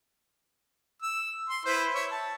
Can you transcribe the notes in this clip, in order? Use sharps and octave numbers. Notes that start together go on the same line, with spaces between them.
E6
C6
E4 B4 C5
C#5 E5
A5